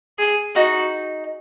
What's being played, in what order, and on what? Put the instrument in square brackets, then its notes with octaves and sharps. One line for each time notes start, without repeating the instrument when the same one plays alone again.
[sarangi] G#4
[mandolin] D#4 [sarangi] F#4